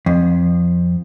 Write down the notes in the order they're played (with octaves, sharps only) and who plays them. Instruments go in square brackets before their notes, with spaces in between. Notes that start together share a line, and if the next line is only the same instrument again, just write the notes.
[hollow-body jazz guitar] F2